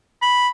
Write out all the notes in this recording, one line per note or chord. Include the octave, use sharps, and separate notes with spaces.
B5